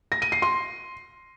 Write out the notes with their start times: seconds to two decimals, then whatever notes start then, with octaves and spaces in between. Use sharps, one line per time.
0.12 A#6
0.22 D#7
0.32 C7
0.42 C6